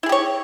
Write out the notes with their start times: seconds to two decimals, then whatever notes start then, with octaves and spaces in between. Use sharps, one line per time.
0.03 E4
0.06 G#4
0.09 G4
0.12 C#5